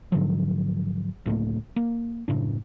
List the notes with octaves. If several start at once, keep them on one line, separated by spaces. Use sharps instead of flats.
G#2 D3 F3 F#3
C#2 A2 A3 A#3
A#3
F#1 A2 C#3 D4